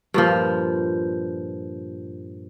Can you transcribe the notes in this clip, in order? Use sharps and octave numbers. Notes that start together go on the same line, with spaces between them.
G2 A#2 F3